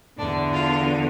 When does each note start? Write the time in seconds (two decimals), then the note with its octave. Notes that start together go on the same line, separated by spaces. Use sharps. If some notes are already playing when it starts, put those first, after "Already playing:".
0.18 E2 D3 D4
0.53 F4